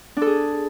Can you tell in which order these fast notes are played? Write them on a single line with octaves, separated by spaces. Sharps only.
D4 A4 G#4